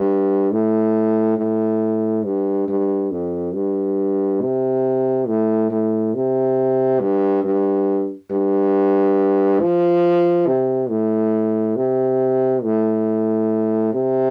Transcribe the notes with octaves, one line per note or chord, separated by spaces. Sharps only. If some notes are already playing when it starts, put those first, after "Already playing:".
Already playing: G2
A2
A2
G2
G2
F2
G2
C3
A2
A2
C3
G2
G2
G2
F3
C3
A2
C3
A2
C3